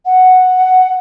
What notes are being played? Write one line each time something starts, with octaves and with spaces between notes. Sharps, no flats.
F#5